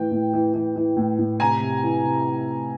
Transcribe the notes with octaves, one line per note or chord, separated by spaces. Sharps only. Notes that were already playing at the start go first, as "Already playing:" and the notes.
Already playing: A2 E3 G5
A2
E3
E3
E3
A2
A2
C3 G#5 A#5
C3
E3
C3